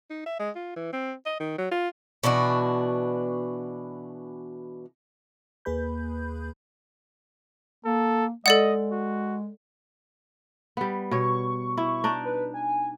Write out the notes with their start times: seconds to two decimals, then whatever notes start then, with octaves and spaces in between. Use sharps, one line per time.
0.10 D#4
0.26 E5
0.39 G#3
0.55 F4
0.76 E3
0.93 C4
1.26 D#5
1.40 D#3
1.58 F#3
1.71 F4
2.23 B2 E3 D4 F#4
5.65 D#2 A#3 G#4 B4 B5 G6
7.85 A#3 A4
8.46 G#3 A4 D5 D#5 F#5
8.91 F#4
10.77 G3 B3
11.11 B2 C#5 C#6
11.77 E4
12.04 D4 D#4 D5
12.25 B4
12.54 G#5